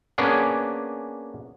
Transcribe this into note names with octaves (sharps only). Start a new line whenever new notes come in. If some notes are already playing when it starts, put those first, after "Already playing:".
A#3 B3 C#4 D4 G#4